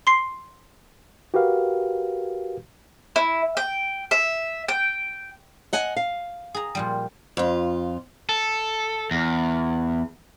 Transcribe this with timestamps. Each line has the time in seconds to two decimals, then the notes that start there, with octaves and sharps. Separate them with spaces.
0.07 C6 C7
1.34 F#4 G4 A#4 B4 F5
3.16 E4
3.57 G5
4.11 E5
4.68 G5
5.73 D#5 F#5 G#5
5.96 F5
6.54 G#4 A#5
6.75 A#2 F3 G3
7.37 F2 F4
8.29 A4
9.11 E2